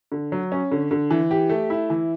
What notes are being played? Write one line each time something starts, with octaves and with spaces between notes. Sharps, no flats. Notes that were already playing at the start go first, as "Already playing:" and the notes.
D3
F#3
C#4
D3
D3
E3
G4
A3
E4
E3